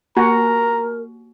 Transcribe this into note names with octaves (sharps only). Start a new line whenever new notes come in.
A#3 F#4 A#4 A#5